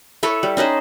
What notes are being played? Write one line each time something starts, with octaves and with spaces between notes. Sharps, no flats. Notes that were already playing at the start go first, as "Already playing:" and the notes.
E4 A4 B4 C#5
G3
C#4 D#4 B4 C5